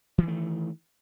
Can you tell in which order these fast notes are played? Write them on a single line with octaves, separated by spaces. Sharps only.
E3 D#3 A3